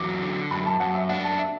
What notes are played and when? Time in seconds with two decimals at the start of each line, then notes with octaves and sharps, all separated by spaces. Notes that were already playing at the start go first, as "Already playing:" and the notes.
Already playing: E2 F#3 D6
0.22 D3
0.51 F#2 B5
0.66 A5
0.80 F#2 F#5
0.95 E5
1.09 D4 F#5
1.24 A5
1.38 E5